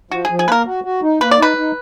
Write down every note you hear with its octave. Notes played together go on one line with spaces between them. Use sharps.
F3 F#4
G#4
F3
G#4
A#3 A#4 B4
F#4
F#4
D#4
A#3 B4
D5
D#4 B4
D#4